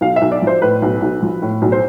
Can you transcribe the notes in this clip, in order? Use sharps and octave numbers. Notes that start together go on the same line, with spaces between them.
B1 F5
E5
B1
D5
F3 C5
A2 B4
B1
B1
F3
A2
B1
C5